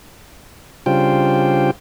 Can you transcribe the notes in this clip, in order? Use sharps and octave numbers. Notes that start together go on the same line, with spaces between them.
C#3 G3 D4 F4 C5 G5